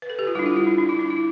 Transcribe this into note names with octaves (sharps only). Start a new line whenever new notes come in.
B4
A4
G4
F4
G3 D4 E4
F4
E4
D4
D4
E4
D4
E4